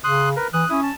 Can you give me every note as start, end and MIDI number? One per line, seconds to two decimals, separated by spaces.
0.04 0.35 49
0.04 0.29 84
0.04 0.29 87
0.04 0.29 90
0.36 0.48 70
0.36 0.48 71
0.53 0.64 52
0.53 0.69 87
0.53 0.69 90
0.69 0.90 61
0.69 0.80 64
0.69 0.80 87
0.83 0.95 81